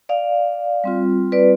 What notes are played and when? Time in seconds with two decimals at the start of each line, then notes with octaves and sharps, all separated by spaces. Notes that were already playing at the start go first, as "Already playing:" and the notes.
0.09 D5 F5
0.84 G3 C4 F4
1.32 B4 D5